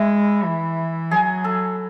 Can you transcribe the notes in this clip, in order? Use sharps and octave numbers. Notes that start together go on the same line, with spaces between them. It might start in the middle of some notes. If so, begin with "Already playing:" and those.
Already playing: G#3 E4
E3
F#3 G#4
A4